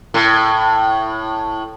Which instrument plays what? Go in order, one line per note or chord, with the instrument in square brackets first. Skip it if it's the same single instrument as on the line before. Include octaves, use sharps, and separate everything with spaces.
[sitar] A2